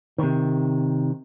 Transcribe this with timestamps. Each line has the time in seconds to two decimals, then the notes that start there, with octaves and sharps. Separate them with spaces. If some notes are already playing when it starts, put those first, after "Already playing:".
0.18 C3 D#3